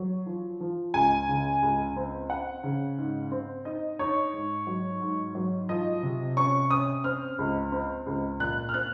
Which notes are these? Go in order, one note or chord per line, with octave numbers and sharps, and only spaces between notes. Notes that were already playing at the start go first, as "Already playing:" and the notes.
Already playing: F#3
F3
F3
C#2 G#5
C#3
C#2
C4
C4 F#5
C#3
G#2
C4
D#4 D#5
D#4 C#5
G#2
F#3
G#2
F#3
F3 D#5
C3
C#4 C#6
C#4 D#6
C4 F6
C#2
C4
C#2
A#2 F#6
F6
C4 F#6